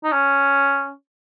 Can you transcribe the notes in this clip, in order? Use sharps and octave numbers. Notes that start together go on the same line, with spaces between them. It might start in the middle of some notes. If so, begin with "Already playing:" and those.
D#4
C#4